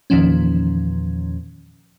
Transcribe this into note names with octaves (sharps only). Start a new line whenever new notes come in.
E2 A#2 D#3 F3 C#4